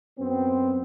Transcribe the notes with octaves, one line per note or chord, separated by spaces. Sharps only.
F#2 B3 C4